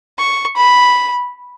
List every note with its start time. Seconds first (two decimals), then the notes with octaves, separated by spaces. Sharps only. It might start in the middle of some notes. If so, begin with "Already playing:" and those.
0.18 C#6
0.56 B5